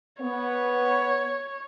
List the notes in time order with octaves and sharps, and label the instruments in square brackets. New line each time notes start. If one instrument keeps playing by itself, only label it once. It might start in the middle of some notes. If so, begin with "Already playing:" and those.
[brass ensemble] B3 [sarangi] C#5